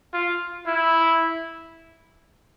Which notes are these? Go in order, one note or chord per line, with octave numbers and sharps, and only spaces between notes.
F4
E4